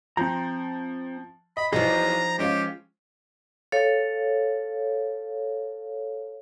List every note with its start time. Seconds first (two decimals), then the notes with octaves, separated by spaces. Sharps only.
0.17 F3 C4 C5 A#5
1.57 D#5 B5
1.73 B1 E3 F3 G3 D#4 G#4 A#5
2.39 G#3 C#4 F4 G4
3.72 A4 C#5 F5